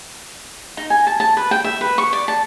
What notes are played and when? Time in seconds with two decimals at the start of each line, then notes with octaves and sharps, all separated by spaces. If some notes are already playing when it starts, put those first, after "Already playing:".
0.77 D#4
0.90 G#5
1.07 A5
1.20 A5
1.37 B4
1.51 G5
1.64 E5
1.81 B4
1.98 C#6
2.13 D5
2.28 A5